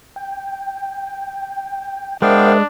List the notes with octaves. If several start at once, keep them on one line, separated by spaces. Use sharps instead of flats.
G5
G#3 B3 D4 A#4 C5 E5 F5 G5